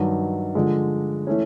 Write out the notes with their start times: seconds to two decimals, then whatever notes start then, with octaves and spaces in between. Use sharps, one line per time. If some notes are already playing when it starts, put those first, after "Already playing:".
Already playing: G2 D#3 F#3
0.55 D3 F3 G#3
1.27 E3 A3 C#4